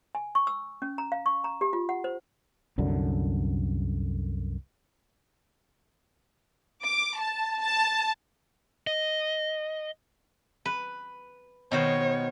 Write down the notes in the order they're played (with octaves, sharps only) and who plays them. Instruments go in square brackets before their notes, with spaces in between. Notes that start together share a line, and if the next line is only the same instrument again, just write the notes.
[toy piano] G#5
C#6
E6
C#4
A#5
F5
C#6
A#5
G4
F4
F#5
C5
[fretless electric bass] C2 F#2 D3
[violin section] D6
A5
A5
[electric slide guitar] D#5
[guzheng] B4
[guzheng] B2 D#3 C5 [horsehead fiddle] C#5